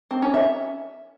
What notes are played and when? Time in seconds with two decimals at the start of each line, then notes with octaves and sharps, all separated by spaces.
0.11 C4
0.22 C#4
0.34 E5